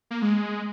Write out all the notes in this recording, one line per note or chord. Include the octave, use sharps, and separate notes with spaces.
A#3
G#3